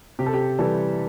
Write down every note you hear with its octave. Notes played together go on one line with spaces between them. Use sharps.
C3 G4
A4
G4
E3 G3 A4